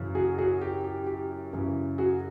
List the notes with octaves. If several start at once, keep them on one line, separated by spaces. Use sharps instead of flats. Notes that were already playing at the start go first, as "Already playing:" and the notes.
Already playing: F#2 C#3 E3
F#4 G#4
F#4 G#4
G4
G4
G4
F#2 C#3 E3
F#4 G#4